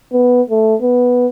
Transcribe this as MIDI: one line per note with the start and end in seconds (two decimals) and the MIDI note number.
0.13 0.42 59
0.50 0.75 57
0.82 1.27 59